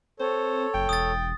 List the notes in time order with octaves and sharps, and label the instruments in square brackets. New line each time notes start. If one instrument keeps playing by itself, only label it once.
[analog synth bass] C4 [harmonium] A4 C#5 [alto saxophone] C5
[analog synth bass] F#1 [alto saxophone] G5
[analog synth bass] E1 [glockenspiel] D#6 A6